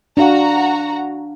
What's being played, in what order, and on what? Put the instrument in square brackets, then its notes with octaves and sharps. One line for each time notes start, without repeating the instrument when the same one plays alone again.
[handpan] D4 F5 [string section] F#4 A#5